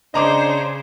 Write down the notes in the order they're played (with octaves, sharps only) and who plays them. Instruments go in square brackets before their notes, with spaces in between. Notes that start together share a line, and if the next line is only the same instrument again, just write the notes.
[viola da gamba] C#3 [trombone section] C#4 D4 [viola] C5 [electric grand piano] D#5 A#5 D6